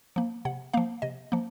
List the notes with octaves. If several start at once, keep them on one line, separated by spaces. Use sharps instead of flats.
F3 A#3
C3 F#5
F3 A#3 F5
C3 D#5
F3 A#3